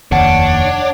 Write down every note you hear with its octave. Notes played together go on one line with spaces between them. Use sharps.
F1 D#2 D4 C#5 F#5